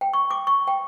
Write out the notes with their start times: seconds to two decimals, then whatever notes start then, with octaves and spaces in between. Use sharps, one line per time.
0.01 G5
0.13 C#6
0.31 D6
0.47 C#6
0.68 G5